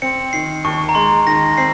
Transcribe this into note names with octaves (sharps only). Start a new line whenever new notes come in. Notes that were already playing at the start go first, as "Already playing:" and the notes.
C4 C#7
D#3 C7
D#2 C#6
A#5
G#3 C6
D#3 A#6
C4 C7